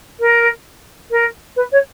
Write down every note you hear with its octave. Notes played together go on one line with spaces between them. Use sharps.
A#4
A#4
B4
C#5